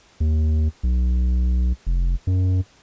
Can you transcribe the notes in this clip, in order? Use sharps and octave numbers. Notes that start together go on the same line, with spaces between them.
D#2
B1
F1
F#2